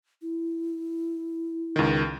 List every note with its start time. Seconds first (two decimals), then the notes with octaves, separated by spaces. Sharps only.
0.22 E4
1.76 C#2 D#3